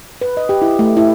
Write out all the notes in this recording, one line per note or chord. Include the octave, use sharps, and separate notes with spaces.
B4
D#5
G4
E4
A3
E4